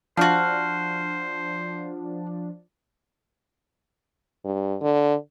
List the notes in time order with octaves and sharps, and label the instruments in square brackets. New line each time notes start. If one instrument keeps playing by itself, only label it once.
[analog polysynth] F3 D4 [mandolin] F#4 F5 [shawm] C5 [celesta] A5
[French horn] G2
D3